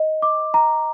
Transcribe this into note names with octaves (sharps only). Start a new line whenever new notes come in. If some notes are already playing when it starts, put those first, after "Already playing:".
Already playing: D#5
D6
A#5